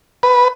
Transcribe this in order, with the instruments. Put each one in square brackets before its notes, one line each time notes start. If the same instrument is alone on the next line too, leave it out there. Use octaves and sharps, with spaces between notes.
[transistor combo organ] B4